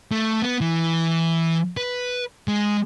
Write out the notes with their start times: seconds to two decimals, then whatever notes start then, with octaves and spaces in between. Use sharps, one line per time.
0.12 A3
0.42 B3
0.61 E3
1.77 B4
2.48 G#3